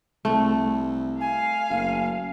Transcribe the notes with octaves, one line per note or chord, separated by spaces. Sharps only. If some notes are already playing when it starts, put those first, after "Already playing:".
C2 A3
F5 G#5
F#1